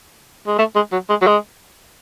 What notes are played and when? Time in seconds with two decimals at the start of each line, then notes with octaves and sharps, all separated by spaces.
0.47 G#3
0.59 A3
0.75 G#3
0.92 F#3
1.10 G#3
1.22 F#3
1.27 G#3